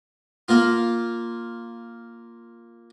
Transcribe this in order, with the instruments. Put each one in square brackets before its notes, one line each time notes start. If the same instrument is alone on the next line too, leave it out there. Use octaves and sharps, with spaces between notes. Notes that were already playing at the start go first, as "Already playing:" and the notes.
[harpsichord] A#3 F4